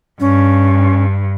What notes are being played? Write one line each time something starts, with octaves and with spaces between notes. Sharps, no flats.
G2 C#4